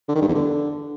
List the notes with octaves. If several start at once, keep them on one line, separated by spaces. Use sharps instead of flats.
D3
D#3
G2
E2
D3